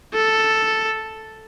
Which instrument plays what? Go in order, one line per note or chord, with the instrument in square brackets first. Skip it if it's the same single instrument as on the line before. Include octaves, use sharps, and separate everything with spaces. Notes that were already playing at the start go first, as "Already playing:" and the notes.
[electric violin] A4